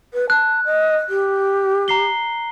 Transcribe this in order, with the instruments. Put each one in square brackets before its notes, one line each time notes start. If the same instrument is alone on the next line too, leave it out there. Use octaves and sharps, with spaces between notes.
[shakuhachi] B4
[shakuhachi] A5 [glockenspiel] F#6
[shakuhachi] D#5
G4
[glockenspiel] A#5 C7 G7